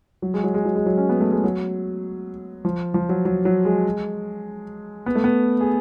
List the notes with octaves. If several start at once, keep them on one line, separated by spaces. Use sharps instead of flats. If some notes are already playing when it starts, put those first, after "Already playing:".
F#3
G#3
F#3
G#3
F#3
G#3
F#3
C#4
B3
A3
G#3
F#3
F3
F3
F#3
F#3
F#3
G#3
B3
A3
B3
G#4